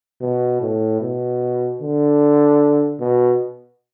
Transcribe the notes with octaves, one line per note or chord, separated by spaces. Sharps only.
B2
A2
B2
D3
B2